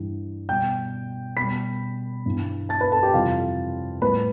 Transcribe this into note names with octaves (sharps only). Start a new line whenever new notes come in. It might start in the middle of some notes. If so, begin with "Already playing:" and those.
Already playing: G2 E3 G3
B2 G3 G5 G6
B2 G3 B5 B6
G2 E3 G3
A5 A6
B4 B5
A4 A5
G4 G5
F2 C3 E3 G3 F4 F5
A2 G3 B4 B5